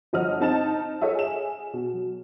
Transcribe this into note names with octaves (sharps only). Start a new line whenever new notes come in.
G1 F3 D#5 F#5 F6
C4 D#4 A5 A6 E7
F4 A4 C#5 D#5 E5
G#4 E7
B2
F#3